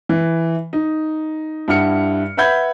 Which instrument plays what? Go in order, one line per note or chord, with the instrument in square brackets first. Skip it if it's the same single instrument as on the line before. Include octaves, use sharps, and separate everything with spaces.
[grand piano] E3
D#4
G2 E4 F#5 F6 C#7
B4 E5 F#5 B5 G6 G#6